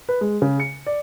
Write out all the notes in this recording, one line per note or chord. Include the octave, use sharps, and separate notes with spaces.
B4
G#3
C#3
C#7
D5